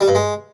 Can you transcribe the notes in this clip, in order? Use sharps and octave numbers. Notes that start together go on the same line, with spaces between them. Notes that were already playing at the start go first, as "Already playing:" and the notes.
G3
G2
G#3